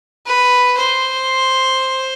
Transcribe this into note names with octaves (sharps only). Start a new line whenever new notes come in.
B4
C5